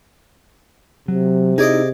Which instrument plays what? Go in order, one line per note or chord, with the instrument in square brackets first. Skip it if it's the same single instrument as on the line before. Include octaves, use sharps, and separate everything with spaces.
[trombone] C3 [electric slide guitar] F#3
[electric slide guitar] D#4 E4 [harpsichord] G#4 D5 D#5